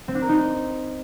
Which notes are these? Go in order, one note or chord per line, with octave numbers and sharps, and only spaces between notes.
C4
D4
A#4
D#4